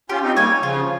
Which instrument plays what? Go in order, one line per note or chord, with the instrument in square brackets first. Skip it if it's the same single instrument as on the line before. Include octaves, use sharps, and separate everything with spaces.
[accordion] C#4 F4 [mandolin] G4
[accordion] C4 D#4
[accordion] G3 A#3 [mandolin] C#5 G#5
[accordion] C#3 F3 [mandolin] F4